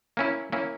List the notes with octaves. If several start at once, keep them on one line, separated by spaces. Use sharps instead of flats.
A#3 C#4 E4
A#3 C#4 E4